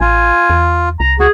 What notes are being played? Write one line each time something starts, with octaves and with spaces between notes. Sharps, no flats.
A1 F4 G#5
E2
C2 A#5
C#2 F#4 G#4